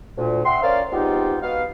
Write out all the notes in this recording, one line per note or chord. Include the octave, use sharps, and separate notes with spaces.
D2 A#2
E5 F#5 G5 C6
C#4 A#4 C5 D5 F5
G#3 B3 C4 D#4 F4 G4
B3 D#4 F#4 F5